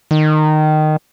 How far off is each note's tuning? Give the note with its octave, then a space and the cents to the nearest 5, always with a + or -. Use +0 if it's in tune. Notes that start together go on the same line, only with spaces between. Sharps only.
D#3 -15